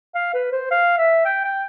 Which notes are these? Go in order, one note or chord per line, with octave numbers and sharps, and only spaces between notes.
F5
B4
C5
F5
E5
G5
G5